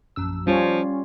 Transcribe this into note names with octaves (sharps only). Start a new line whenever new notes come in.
A#1 F#2 E6
F3 G3 C#4 F4 C#5